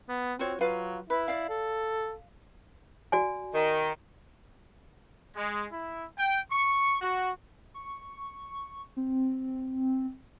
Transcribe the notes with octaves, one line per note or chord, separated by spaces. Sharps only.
B3
C4 F4 F#4 C#5
F#3 F4 B4 F5
E4 B4
D5 F5
A4
F#4 D5 G#5
D#3
G#3
E4
G5
C#6
F#4
C#6
C4